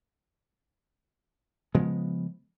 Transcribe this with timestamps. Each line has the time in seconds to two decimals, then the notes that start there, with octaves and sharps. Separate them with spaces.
1.75 C#3 F3 G#3 B3